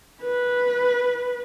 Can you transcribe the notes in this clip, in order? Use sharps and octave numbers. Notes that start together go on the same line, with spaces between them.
B4